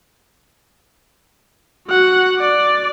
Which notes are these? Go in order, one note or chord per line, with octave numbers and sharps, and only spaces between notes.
F#4 F#5
D5